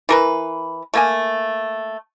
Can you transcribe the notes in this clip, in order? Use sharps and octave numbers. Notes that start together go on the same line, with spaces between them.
E3 A#4 B4
A3 A#3 G#5